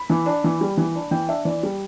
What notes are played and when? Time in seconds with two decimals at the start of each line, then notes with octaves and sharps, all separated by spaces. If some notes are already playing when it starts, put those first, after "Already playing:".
Already playing: B5
0.10 E3
0.26 D4
0.44 E3
0.61 G3
0.77 E3
0.95 D4
1.11 E3 G5
1.28 D4 E5
1.45 E3 D5
1.63 G3